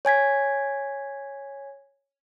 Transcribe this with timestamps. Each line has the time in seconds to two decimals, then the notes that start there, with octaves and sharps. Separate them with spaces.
0.05 C#5 G#5 G#6 B6